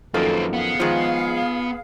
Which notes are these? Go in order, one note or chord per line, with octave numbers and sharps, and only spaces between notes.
F#2 D#3 F3 A#3 C4 A4
B3 G#4 F5
D#3 F3 G#3 F4